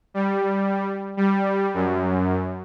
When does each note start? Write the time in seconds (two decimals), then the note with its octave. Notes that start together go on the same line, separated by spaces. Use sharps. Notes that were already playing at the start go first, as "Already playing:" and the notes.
0.14 G3
1.17 G3
1.74 F#2